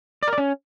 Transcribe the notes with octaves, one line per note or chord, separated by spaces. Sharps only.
D5
A#4
D5
C#4